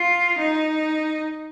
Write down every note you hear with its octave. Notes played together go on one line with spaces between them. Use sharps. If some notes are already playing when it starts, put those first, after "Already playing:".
Already playing: F4
D#4